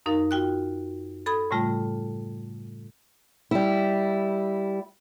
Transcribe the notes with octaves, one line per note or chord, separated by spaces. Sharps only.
F#2 D#4 A#4 F5 A6
F4 F#4 G5 F#6
A4 B5 D#6 G#6
A2 C#3 G3 A3 F4
G3 E4